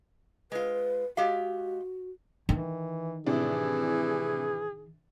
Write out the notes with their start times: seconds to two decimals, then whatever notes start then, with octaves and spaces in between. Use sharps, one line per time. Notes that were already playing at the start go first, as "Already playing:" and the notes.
0.52 G#3 F4 B4
1.17 G#3 F#4 G4 F5
2.49 D#3 E3
3.27 A2 C3 E3 D4 G#4